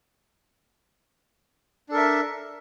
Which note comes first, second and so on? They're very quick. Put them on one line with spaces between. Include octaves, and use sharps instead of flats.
D4 A4 A#4 E5